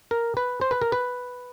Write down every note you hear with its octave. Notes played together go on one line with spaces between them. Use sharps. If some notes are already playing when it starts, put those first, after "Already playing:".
A#4
B4
C5
B4
A#4
B4